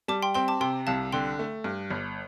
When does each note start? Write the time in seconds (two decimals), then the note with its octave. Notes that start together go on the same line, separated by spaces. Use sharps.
0.08 G3 A5 D6
0.23 G5 C6
0.34 C4 G5 C6
0.48 A5 D6
0.61 C3 G5 C6
0.87 C2 F5 A5
1.12 D3 G5 C6
1.39 A3
1.64 G2
1.90 G1